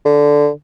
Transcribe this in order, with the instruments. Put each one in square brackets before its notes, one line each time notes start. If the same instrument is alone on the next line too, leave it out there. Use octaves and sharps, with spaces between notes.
[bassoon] D3